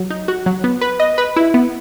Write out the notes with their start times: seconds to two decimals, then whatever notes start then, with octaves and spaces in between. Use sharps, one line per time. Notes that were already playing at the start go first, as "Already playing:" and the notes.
Already playing: F#3
0.10 D#4
0.28 F#4
0.46 F#3
0.64 B3
0.81 B4
1.00 D#5
1.18 B4
1.36 E4
1.54 B3